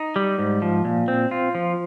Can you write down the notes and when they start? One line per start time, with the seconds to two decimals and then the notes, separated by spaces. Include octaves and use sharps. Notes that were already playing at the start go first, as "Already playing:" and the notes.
Already playing: D#4
0.16 G3
0.38 G#2
0.62 F3
0.85 A#2
1.08 C4
1.31 F4
1.55 F3